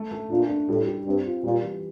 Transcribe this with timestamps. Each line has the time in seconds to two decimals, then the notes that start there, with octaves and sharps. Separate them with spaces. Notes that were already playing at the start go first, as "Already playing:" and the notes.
Already playing: A3
0.11 A3
0.30 A#2 D4
0.49 D4
0.68 A2 G3
0.87 G4
1.06 G2 C4
1.25 F4
1.44 A#2 G3
1.63 E3